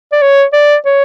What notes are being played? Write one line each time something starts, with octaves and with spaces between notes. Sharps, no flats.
D5
C#5
D5
C#5